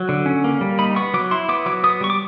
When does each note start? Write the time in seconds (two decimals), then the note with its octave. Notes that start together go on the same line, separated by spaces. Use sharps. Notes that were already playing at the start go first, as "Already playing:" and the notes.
Already playing: F#3
0.09 D3
0.26 C#4
0.44 A#3
0.61 G3
0.79 D#4 B5
0.96 B3 C#6
1.14 F#3 D6
1.31 E4 C6
1.49 B3 D6
1.66 F#3 D6
1.84 B3 D#6
2.01 G3 C#6
2.10 D6